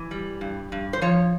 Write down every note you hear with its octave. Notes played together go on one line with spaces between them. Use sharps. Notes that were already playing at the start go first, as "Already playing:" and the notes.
Already playing: E3
G3
G2
G2
C5
F3 C#5